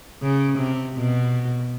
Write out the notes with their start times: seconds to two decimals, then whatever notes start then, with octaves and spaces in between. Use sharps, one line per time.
0.22 C#3
0.59 C3
0.97 B2